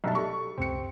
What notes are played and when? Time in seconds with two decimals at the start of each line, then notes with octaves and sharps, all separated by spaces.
0.04 B1 G2 D#5 E5 A5
0.15 G4 A4 C#6
0.58 C#2 F#2 C3 C4 C#7